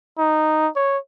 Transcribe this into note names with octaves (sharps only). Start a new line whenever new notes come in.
D#4
C#5